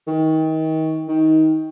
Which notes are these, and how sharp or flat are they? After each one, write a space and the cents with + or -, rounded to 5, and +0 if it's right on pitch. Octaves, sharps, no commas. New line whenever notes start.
D#3 +30
D#3 +25